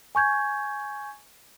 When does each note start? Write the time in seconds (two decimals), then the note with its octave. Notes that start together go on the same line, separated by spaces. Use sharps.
0.15 G#5 C#6 G6 G#6